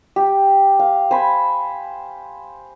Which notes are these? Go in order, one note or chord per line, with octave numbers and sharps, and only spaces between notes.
G4
F5
C5 G#5 B5